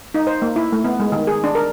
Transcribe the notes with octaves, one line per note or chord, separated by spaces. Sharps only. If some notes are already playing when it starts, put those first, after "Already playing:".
D#4
C5
A#3
E4
A3
B3
G#3
D#3
G#4
D4
A#4